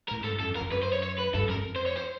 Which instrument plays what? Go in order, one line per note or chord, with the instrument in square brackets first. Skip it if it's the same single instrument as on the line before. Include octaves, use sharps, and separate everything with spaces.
[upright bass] A2 [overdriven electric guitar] A#4
[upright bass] G#2 [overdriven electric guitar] A4
[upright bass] G2
[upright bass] F#2 [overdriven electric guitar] A4
[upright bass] F2
[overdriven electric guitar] A#4
[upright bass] F2
[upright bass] F#2 [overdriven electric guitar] B4
[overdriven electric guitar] C5
C#5
C#5
B4
[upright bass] G2 [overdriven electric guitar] A4
[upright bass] F#2 [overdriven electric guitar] A#4
[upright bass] F2
[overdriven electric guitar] C5
C#5
C5